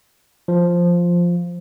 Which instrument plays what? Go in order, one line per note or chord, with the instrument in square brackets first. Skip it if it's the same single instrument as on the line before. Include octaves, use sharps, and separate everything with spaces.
[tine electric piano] F3